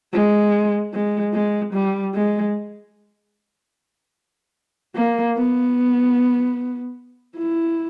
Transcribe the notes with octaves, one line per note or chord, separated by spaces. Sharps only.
G#3
G#3
G#3
G3
G#3
A#3
B3
E4